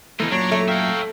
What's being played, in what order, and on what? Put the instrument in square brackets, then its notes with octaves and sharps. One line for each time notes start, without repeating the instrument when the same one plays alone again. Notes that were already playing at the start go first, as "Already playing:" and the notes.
[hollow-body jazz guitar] B2 E3 A3 [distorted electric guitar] D#4 F4
[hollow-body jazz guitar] F#2 A#2 F#3 [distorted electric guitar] D4 [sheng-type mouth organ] C#5 A#5
[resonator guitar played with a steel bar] A3
[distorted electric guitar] C#5 E5 [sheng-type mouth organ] F5 G5 A#5